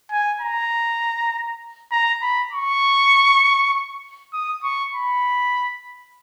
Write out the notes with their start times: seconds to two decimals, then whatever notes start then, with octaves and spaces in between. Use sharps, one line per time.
0.11 G#5
0.41 A#5
1.92 A#5
2.22 B5
2.53 C#6
4.33 D#6
4.63 C#6
4.94 B5